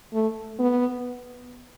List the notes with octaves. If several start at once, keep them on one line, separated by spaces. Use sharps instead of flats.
A3
B3